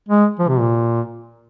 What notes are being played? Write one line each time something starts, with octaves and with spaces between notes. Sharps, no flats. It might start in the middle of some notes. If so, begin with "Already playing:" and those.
G#3
F3
C3
A#2